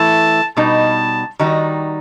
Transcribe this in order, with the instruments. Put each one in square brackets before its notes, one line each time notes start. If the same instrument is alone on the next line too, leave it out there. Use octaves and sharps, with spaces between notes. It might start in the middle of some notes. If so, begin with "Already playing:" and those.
Already playing: [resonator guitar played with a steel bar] E3 A3 E4 [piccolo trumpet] A5
[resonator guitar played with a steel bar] B2 G3 B3 D#4 [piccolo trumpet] A5
[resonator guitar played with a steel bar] D#3 G3 D#4 F#4